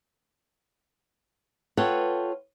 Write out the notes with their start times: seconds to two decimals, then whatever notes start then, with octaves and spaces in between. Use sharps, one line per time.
1.77 F4 A4 B4 C#5 F#5 G5